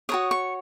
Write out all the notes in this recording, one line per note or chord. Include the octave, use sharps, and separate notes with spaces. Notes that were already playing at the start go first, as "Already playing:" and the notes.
F#4 A#4 C#5 D#6
C#6